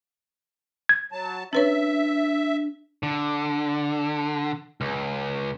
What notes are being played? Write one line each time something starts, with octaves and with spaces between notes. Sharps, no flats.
G#6
F#3 A5
C#4 D4 B4 C#5 E5
D3
C#2